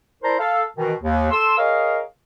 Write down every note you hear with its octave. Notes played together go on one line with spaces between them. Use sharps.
E4 A#4 C5 D5 A5 A#5
A4 F5
B2 D#3 E3
D#2
A4 C6 E6
G#4 A#4 C#5 D#5 F5